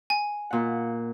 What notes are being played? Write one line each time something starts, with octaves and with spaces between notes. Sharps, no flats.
G#5
A#2 F#5